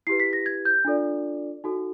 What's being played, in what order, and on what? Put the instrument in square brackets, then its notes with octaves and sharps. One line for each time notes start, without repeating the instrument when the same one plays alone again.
[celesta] E4 G4 B4 C7
B6
A#6
G#6
G6
D4 F4 A4 D5
D#4 F#4 A4